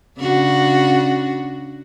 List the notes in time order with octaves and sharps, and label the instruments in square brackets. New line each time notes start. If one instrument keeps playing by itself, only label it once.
[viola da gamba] C#3 D4 F#4